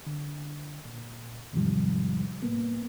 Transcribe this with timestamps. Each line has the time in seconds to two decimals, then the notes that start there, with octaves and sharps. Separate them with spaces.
0.07 D3
0.85 A#2
1.53 E2 G#2 C3 D#3 F3 G3
2.42 A2 A#3 B3